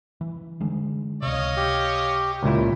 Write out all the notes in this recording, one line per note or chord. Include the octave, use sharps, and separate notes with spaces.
E3
D3 D#3 G#3
C#2 C3 C#5 D#5 F5
G4
C#2 A#2 E4